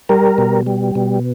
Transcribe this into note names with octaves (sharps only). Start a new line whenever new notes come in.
G3 A#4
B2
G3
B2